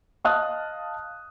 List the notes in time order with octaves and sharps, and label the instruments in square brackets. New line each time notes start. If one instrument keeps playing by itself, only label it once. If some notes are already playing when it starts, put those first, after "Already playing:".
[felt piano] D#5 F5 A5 D#6 F6 F#6